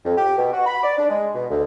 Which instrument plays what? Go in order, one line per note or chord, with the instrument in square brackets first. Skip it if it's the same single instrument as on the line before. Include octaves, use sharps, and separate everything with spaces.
[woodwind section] F2
G4
B2
F#4
B5
D5
D4
G#3
B2
D2